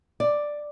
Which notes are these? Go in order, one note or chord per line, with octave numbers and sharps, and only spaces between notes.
D5